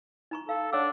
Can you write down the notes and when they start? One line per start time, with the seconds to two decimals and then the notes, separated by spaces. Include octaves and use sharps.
0.31 D#4 A#5 C#6
0.49 A4 F5
0.73 D4 C#5 F#5 E6